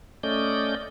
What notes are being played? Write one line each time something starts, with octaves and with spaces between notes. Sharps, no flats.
A3 C#4 D5 D#5 G6